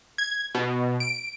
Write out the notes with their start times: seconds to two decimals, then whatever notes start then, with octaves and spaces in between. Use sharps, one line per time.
0.18 G#6
0.55 B2
1.00 D7